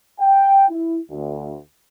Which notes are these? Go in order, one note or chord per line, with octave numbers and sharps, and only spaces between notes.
G5
E4
D2